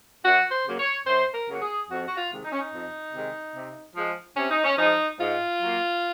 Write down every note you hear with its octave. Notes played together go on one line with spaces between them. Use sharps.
F#2 F#4
C5
C#3 F#3 A#3
C#5
F#2 C5
A#4
C#3 F#3 A#3 F#4
G#4
F2 F#4
F#4
F4
C3 D#3 G#3
D#4
C#4
D#4
F2
C3 D#3 G#3
C3
F3 G#3
C3 C#4
D#4
C#4
F3 G#3 D#4
G#2 F4
F#3 A#3